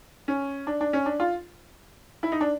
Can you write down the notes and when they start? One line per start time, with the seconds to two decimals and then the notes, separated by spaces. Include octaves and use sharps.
0.28 C#4
0.67 D4
0.81 D4
0.93 C#4
1.06 D4
1.20 F4
2.23 E4
2.32 D#4
2.41 D4